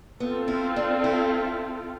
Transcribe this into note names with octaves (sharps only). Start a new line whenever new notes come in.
B3 C4 F4 A4
E4
D4
E4